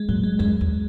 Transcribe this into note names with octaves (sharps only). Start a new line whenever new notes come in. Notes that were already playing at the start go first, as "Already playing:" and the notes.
Already playing: G#3
A#2 F#3
G#3
F#2 G#3
E2